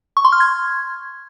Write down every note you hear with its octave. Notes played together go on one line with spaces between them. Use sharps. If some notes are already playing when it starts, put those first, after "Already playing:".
C#6
C6
F6
G#6